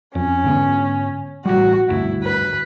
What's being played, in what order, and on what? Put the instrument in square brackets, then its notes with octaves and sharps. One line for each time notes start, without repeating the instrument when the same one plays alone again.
[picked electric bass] F2 [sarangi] C#4
[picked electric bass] G#2 D3 B3
[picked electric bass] A1 G3 [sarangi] F#4
[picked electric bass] G#1 D2 G2 [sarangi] E4
[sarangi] B4